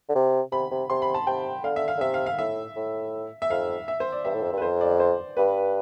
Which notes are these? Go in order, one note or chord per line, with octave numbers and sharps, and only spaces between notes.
D3
C3
C3 B5
C3
C3 C6
B5
A5
C3 G5
D3 F5
E5
F5
D3
C3 E5
F5
F5
A2 E5
A2
E5
F2 F5
E5
C5
D5
G2 E5
A2
F2
G2
B4
F2 C5
D5
C5
G2 B4